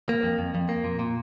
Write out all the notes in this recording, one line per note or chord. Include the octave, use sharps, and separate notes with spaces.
A#3
F2
F2
F2
A#3
A#2
A#2